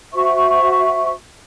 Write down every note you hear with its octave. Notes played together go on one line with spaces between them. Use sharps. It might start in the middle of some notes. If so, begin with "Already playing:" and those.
F#4 C5 E5 C#6